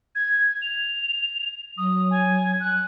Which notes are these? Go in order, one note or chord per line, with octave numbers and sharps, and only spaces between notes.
G#6
F7
F#3 D#6
G#5
F#6